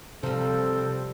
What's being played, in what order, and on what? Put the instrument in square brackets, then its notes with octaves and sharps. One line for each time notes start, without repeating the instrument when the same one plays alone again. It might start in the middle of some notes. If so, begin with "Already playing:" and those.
[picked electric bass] C3 [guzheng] F3 G3 [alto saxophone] C4 [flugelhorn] A4